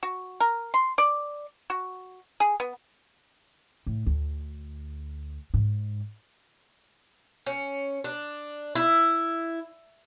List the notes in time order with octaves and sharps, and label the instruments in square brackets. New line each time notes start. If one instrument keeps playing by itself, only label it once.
[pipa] F#4
A#4
C6
D5
F#4
G#4
B3
[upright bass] A2
D2
G#2
[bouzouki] C#4
D4
E4